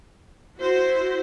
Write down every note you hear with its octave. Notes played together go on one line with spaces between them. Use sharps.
E4 F#4 C5